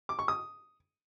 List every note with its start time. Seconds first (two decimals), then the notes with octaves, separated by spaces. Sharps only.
0.09 D6
0.19 C#6
0.28 D#6